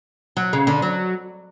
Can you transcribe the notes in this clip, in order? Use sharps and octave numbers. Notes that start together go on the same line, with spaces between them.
F#3
C#3
D3
F#3